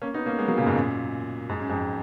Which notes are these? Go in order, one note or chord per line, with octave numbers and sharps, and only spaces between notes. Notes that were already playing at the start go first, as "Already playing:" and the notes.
A#3 C#4
B3 D#4
A#3 C#4
G#3 B3
F#3 A#3
A#2 C#3
G#2 B2
F#2 A#2
G#2
F#2
F2 G#2